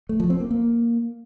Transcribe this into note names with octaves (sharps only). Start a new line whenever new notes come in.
A3
F3
C4
A#3
A#3